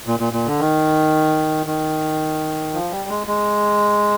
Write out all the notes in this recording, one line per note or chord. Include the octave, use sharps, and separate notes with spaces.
A#2
A#2
A#2
D3
D#3
D#3
F3
G3
G#3
G#3